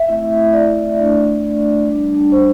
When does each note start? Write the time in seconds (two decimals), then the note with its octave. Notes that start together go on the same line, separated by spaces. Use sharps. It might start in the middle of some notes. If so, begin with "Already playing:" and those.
Already playing: E5
0.08 A3 C4 E4
0.53 D5
0.98 A3 D4
1.87 G3 D4
2.32 C5